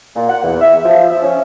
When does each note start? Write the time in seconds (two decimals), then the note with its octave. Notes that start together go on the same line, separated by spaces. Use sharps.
0.16 A#2
0.29 F#5
0.43 E2
0.60 E5
0.84 F3
1.10 E5
1.22 C#4